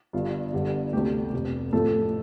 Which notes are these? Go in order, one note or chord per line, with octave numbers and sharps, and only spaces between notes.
G1 G2 D3 F4
G1 G2 D3 G3
D2 C3 A3 G4
F1 F2 C3
A1 A2 F3 A3 A4